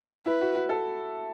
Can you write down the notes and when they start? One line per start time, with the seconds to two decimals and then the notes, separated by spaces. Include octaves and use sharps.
0.26 E4 B4
0.41 F#4
0.55 F#4
0.69 A4